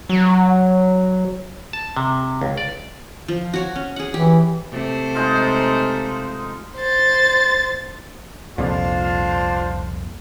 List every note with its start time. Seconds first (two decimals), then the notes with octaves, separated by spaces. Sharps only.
0.09 F#3
1.73 A5
1.97 C3
2.41 C#2
2.57 D5
3.28 F3
3.54 F#4 C#5
3.75 C#4
3.96 G#4 F#5
4.14 E3 G4
4.71 C3 A3 C5
5.15 G#3 D#4 F4
6.77 C5 A6
8.58 C2 F2 A#2 D4 F4 C5